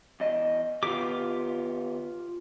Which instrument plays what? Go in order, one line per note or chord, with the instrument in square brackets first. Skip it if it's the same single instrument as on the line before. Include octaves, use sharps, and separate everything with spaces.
[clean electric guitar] E2 D#5
[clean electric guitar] D#3 B3 G4 [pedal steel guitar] F4 D6